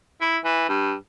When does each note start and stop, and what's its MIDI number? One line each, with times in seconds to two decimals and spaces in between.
0.21 0.37 64
0.45 0.65 52
0.69 0.93 43